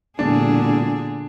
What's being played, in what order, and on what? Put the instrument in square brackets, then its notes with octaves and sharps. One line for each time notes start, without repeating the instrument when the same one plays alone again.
[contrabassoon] E1 [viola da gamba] A#2 D3 G#4 [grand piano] D4